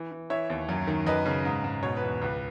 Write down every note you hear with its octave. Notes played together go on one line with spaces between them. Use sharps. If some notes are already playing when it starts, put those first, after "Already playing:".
Already playing: E3
E3
E3 C#5 E5
D#2
F#2
D#3
F#2 B4 D#5
C#3
G#2
G#2
B2 C#5
B4
E2
C#2 B4